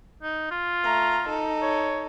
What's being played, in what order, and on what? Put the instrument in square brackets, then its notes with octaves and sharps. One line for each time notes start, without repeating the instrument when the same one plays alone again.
[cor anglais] D#4
F4
[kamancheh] A3 A#5
D#4 A4
[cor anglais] C#5